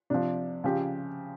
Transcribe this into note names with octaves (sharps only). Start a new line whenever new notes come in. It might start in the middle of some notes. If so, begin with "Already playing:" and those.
C3 F3 D4
C#3 F3 G4